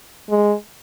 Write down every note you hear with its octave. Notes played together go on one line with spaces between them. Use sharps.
G#3